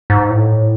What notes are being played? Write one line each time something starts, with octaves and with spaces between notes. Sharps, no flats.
G#2
A2